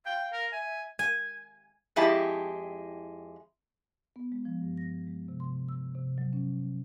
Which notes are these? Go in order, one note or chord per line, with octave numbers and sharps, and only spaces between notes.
F5 G5
A#4
E5 G#5
G#5
F2 G#3 E4 G4 A5
B3
G#3
F3
G2
A#6
G#3
C3
C6
E6
C3
F#3
C#4